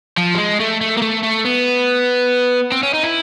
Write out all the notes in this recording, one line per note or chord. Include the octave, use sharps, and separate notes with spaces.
F3
G3
G#3
A3
A3
A#3
A3
A3
B3
C4
C#4
D#4
E4